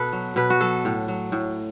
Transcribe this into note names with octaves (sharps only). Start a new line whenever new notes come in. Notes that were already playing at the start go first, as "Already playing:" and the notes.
Already playing: B2 A4 B4
F#3
B2 B4
F#4
F#3 A4
A2
F#3
A2